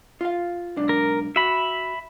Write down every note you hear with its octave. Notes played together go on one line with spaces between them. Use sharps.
F4 F5
B1 G#2 D4
A#4
F#4 E5 B5